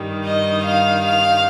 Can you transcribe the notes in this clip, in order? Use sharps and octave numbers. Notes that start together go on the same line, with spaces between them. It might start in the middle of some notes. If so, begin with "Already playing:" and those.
Already playing: G2 D#3 G3
D#5
F5
F5